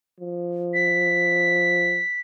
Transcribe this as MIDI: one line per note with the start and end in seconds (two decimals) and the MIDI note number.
0.20 2.02 53
0.74 2.20 95